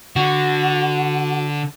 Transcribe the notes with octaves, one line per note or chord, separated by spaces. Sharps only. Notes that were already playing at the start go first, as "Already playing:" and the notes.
D3 F#4